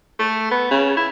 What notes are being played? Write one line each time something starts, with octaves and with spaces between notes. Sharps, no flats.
A3
B3
C#3
E4